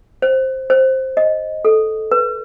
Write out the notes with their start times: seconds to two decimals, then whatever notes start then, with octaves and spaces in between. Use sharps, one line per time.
0.22 C5
0.70 C5
1.17 D#5
1.65 A4
2.11 B4